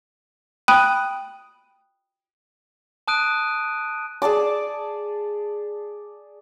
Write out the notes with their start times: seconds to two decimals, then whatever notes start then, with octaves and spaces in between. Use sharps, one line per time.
0.68 G5 B5 D#6 F#6 D#7
3.08 A5 D#6 F#6 D7 D#7
4.22 G#4 D5 A5 D6